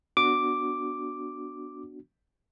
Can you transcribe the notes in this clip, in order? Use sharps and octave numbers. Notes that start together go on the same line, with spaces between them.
B3 D4 F#4 D6